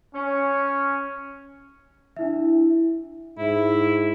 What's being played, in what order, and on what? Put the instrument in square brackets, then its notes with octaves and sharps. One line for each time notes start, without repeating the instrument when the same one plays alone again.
[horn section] C#4
[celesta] D4 E4 E5
[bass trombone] G#2 [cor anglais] E4